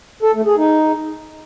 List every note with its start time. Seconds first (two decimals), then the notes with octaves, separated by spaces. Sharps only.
0.23 A4
0.34 A3
0.46 G#4
0.58 D#4